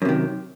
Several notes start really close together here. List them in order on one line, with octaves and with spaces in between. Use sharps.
F#2 C3 D#3